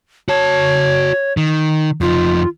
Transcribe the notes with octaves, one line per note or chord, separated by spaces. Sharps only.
F#4 C#5 A5
D#3
F2 D#4 F4